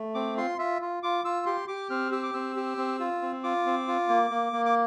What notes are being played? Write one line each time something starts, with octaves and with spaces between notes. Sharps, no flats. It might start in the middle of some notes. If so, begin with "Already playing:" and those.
Already playing: A3
C4 D6
F4 C6
F4 E5
F4
F4 D6
F4 E6
G4 C6
G4 D6
C4 F6
G4 E6
D6
C4 E6
G4
C4
F4
C4
F4 D6
C4
F4
A#3
A#3
A#3
D6